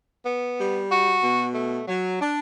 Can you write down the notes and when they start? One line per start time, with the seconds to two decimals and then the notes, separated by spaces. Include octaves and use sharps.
0.25 B3
0.58 G3
0.90 F#4
1.23 B2
1.55 A3
1.88 F#3
2.20 D4